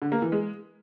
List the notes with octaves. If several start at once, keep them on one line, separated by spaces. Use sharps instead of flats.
D3
A#3
E3
G#3